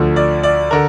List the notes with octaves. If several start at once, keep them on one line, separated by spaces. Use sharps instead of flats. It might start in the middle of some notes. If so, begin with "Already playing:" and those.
Already playing: D2 D3 F3
D5
D5
D3 A#4